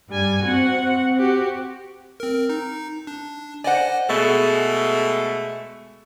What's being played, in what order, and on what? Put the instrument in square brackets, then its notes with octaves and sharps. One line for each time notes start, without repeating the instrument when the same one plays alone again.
[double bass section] G2 [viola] G3 G#5
[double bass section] C4 [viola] F#4 F#5
[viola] F#4 G4
[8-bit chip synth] C4 A#4
D#4
D4
[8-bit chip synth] C5 D#5 G#5 [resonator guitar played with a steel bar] D5 F#5
[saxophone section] B2 G#3 A3